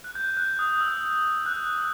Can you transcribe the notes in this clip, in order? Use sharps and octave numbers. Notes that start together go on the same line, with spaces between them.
F#6
G6
F#6
D#6
E6
F#6
E6